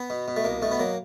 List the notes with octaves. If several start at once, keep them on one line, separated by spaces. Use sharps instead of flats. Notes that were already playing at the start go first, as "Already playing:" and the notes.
Already playing: B3
B2
B2
A3
C2 A#3
B2 A3
B3
F#3 A#3